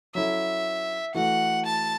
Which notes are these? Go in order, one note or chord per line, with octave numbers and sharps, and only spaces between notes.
F#3 C#4 E4 A4 E5
E3 A3 F#4 A4 F#5
A5